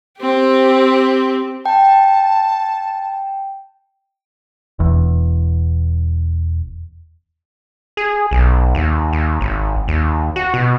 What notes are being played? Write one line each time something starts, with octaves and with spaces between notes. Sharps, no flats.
C4 G4
G5 A5
E1 E2
G#4
B1
D#2
D#2
G#1
D#2
F#4
B2